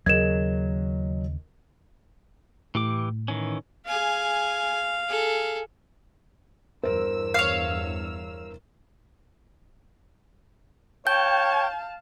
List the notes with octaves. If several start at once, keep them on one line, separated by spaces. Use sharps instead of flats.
D#2 C#3 F#3 G#4 A#4 D#5 G#6 E7
A2 E3 G4 D6
D#3 E3 C#4
G#4 F5 G#5
G#4 A4
E2 G2 A#4 C5 E6
C#5 F5
C#5 F5 G5 A5 G6